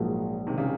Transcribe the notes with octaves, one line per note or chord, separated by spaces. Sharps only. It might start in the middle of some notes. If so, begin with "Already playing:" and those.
Already playing: A#1 G#2 F3 F#3 G#3 A#3
C3 D#3
C#3